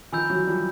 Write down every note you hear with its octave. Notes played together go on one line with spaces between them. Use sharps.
D#3 F3 G#5 B5 E6 G6
E3 F#3
F3 G3